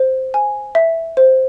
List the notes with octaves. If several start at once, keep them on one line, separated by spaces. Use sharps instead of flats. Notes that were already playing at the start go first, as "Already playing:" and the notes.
Already playing: C5
G#5
E5
C5